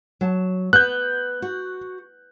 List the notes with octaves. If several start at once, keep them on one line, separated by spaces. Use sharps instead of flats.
F#3 A5
B3 F#6 G6
F#4